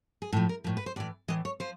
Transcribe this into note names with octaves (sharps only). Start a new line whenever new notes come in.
G#4
A2 F3 A4
A#4
A2 F3 A#4
B4
C5
A2 E3 D5
A2 E3 D#5
C#5
F3 C5